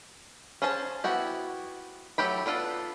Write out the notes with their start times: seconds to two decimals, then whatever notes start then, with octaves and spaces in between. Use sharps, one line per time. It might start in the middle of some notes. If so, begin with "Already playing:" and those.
0.62 C#4 G#4 C5 A5
1.04 B3 E4 F#4 G4
2.18 F#3 A3 G4 B5
2.46 B3 D4 F4 A4